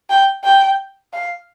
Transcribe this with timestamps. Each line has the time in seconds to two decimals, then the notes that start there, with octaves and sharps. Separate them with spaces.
0.10 G5
0.44 G5
1.13 F5